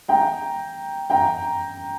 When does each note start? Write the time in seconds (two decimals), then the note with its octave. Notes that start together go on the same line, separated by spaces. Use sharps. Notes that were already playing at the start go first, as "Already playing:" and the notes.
0.09 G5 A#5
1.10 G5 A#5